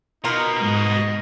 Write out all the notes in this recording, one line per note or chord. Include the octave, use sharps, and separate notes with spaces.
B2 D#4 F4 A#4
G#2 D#5